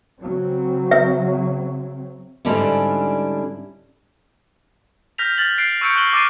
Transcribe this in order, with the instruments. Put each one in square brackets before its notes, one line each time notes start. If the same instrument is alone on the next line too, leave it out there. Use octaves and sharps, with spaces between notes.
[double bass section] C#3 F#3 C4
[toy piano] E5
[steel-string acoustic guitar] G#2 D3 G3 C#4 D4 E4
[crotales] F6 G6 A#6 B6 F7
F6 A6 F#7
F#6 A6 C7 D7
C#6 E6 G6 C#7 D7
C#6 F#6 F#7 G7
D6 F6 A6 C7 D7 D#7